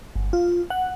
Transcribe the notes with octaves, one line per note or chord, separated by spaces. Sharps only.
G1
F4
F#5